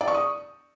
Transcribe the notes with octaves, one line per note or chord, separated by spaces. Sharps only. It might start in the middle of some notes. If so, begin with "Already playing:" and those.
D5
C#6
D#6